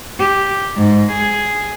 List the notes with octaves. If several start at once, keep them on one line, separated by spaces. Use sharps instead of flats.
G4
G#2
G#4